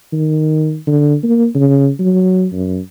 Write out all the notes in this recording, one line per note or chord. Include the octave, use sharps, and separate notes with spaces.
D#3
D3
A#3
C#3
F#3
F#2